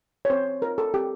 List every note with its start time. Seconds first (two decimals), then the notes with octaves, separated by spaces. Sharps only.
0.25 C#5
0.30 C4 C5
0.62 F4 A#4
0.78 A4
0.94 C4 G4